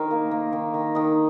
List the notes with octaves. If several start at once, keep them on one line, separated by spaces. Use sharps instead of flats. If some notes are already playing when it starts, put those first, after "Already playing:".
Already playing: D#3 A#4 C5
A#3
A#3
D#3
D#3
D#3 D#5